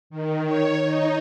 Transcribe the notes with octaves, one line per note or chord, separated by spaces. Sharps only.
D#3
C#5
D#4